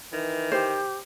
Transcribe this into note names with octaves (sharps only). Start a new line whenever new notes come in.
D#3 E3
G4 C5